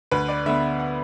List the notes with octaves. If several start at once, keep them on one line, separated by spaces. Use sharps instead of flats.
D2 B4
D5
D3 B3 E5
F#5